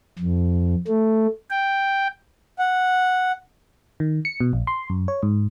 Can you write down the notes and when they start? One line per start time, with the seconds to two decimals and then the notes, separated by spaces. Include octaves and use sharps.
0.18 F2
0.88 A3
1.51 G5
2.59 F#5
4.00 D#3
4.25 C#7
4.40 B2
4.53 A#1
4.67 C6
4.90 F#2
5.08 C#5
5.23 G#2